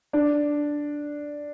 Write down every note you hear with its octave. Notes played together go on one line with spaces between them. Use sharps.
D4